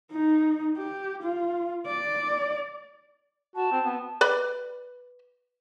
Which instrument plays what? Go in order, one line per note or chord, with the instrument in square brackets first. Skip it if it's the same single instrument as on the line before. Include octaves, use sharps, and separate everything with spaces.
[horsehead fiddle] D#4
G4
F4
D5
[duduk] F#4 [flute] A5
[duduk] C4
B3
[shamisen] B4 D5 B5